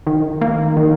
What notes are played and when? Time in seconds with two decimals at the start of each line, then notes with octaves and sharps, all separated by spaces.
0.07 D#3
0.41 A#3
0.77 D#3